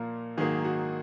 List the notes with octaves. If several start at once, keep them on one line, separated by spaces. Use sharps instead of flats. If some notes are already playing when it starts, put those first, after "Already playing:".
Already playing: A#2 F3 A#3 A#4 F5
G#2 D#3 F#3 A#3 G#4
F#4